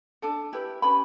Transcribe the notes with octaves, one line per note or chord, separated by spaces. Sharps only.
D4 A4 A5
E4 G4 B4
C#4 G4 B4 B5